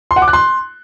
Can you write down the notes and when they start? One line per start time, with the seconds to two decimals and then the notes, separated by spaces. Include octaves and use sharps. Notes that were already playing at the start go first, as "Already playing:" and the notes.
0.11 C6
0.16 F#5
0.22 D6
0.28 F#6
0.33 C6